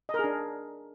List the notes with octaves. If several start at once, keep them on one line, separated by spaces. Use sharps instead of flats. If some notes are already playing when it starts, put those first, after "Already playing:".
D#5
A#4
G#4
D4